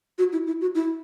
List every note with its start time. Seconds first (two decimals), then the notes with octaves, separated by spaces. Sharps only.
0.18 F#4
0.33 E4
0.47 E4
0.61 F#4
0.75 E4